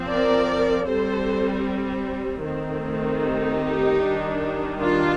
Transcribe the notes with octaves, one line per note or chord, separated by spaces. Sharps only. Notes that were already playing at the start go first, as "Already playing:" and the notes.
Already playing: F3 C4
A#4 D5
G3 C4 A4 C5
D#3 A3 C4
D#4 G4
D#3 G3 D4
D4 F4